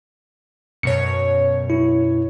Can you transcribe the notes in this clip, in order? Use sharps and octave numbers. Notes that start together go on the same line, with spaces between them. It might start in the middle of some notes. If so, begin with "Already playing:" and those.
F#2 B2 C#5 C#7
E4